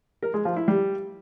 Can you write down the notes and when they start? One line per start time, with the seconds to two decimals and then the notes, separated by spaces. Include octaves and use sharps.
0.23 A#4
0.34 G#3
0.45 F3
0.56 E4
0.68 G3